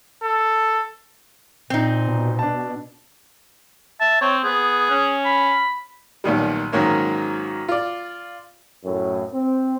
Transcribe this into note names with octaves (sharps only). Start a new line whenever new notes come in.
A4
A#2 C4 D#4
B2
D4 A5
E5 A5
C4 C#5
B3 G#4
C#4
B5
B1 A#2 D#3 G3
G#2 D#3 F#3 A#3 C#4
F4 D5
F#2 A2
C4